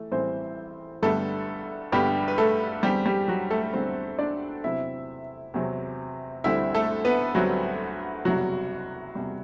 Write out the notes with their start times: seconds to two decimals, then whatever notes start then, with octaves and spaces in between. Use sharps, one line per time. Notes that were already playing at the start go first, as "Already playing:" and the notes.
Already playing: E3 A3
0.11 A1 A2 E3 G3 C4 C5
1.02 G1 G2 D3 G3 A3 B3 A4
1.92 G1 G2 D3 G3 B3 G4
2.28 B4
2.38 A3 A4
2.83 E2 D3 G3 C4 G4
3.06 G3 G4
3.28 F#3 F#4
3.50 A3 A4
3.73 E2 D3 G3 C4 C5
4.19 D4 D5
4.64 E2 C3 F#3 C4 E4 E5
5.54 E2 C3 F#3 C4
6.44 D2 D3 G3 C4 E4 E5
6.74 A3 A4
7.05 B3 B4
7.35 D2 D3 F#3 G3 C4 F#4
8.25 F#1 E2 C3 F#3 G3 F#4
9.15 E2 C3 G3